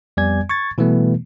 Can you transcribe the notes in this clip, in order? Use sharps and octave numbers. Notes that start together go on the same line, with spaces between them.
F2 G3 B3 D5 G#5 G#6
C#6 G#6 A6
B2 E3 G3 A3 B3